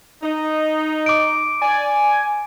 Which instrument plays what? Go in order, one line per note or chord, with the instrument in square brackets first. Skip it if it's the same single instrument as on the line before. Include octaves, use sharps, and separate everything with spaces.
[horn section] D#4
[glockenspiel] D6 D7
[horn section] D5 [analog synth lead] G#5